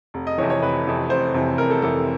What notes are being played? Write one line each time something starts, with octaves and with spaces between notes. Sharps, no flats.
F1
D#5
F2 C3 E3 C#5
C#5
F1 B4
F2 C3 E3
F1 C5
F2 C3 E3
F1 A#4
A4
F2 C3 E3 A4